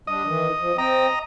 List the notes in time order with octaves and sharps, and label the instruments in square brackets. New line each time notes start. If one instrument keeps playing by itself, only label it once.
[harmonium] G3 D4 [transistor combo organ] D#5
[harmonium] D#3 E3
F3
[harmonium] C4 G5 [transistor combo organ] D#5 A#5